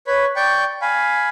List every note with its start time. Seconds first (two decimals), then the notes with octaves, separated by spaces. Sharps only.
0.07 B4 C#5 B5
0.36 D5 G5 C#6 G6
0.82 F5 G#5 B5